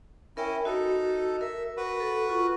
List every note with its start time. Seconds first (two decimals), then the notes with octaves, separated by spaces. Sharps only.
0.37 C#4 E4 A#4 E5 G5
0.65 D#4 F#4 A4
1.41 A#4 E5
1.77 F#4 B4
2.00 A4
2.29 F4 C#6